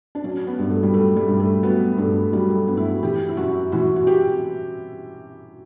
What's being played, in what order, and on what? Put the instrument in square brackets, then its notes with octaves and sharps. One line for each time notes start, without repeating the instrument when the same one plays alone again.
[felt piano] D4
F#3 C#4
B3
G2
A3
G3
F#3 A3
G3
G2
A3
F#3 B3
G2 A3
F#3 G3
A3
G2 B3
E4
F#4
E3 G4
E4
F#2 F#4
E3 F#4
F#4
G4